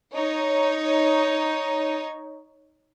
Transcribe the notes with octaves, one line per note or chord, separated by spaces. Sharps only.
D#4 C#5